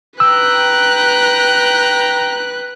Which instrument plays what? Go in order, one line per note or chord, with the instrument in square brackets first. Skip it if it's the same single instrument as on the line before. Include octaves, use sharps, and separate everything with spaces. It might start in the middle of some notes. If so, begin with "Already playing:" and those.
[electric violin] B4 F#6 [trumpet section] G5 A#5 [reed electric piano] E6